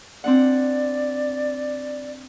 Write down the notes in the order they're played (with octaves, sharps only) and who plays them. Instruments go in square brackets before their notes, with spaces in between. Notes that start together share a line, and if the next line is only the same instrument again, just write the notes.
[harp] C4 D4 F#5 [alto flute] D5